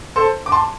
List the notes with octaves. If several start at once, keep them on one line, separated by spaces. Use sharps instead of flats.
A4 C5
D6
A5 C6